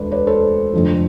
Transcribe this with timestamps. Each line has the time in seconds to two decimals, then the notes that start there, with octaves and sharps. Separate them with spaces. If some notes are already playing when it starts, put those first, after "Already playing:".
Already playing: E1 D2 B4 C5 D5
0.11 B4 D5
0.27 A4 C5
0.73 F1 F2 D3 F3